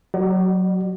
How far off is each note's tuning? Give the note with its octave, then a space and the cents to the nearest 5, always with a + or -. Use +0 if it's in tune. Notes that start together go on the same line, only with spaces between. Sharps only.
F#3 +0 F#4 +40 D5 +35